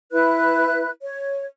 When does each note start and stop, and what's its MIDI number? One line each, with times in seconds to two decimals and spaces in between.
0.12 0.89 64
0.12 0.89 71
0.12 0.89 90
1.02 1.45 73